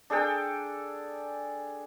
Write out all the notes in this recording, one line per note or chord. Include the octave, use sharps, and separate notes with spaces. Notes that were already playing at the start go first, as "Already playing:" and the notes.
D4 G#4 A4 G5